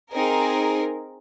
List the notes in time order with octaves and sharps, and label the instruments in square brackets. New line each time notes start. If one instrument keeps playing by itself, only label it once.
[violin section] C4 D#4 G#4 A#4